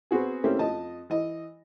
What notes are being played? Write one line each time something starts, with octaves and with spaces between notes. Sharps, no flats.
B3 C4 F#4 G#4
A3 A#3 C4 C#4 E4 G4
F2 D#5 A5
E3 D#5